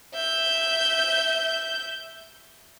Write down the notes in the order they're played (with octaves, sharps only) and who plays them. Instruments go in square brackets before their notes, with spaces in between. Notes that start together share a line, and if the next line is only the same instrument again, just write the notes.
[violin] E5 G6